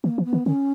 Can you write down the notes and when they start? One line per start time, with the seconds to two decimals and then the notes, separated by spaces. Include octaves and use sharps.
0.04 D#3 A#3
0.18 E3
0.25 B3
0.33 D#3
0.46 D3 C#4